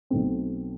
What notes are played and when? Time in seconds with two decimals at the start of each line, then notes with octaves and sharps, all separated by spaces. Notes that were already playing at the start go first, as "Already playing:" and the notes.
0.10 B1 B2 A3 C4